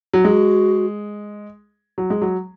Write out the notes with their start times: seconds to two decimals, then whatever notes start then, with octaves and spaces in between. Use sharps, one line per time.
0.13 F#3
0.24 G#3 F#4
1.98 F#3
2.10 G#3
2.22 F#3